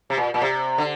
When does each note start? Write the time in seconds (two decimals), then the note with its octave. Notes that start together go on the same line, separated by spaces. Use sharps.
0.10 C3
0.17 A#2
0.34 A#2
0.42 C3
0.78 D3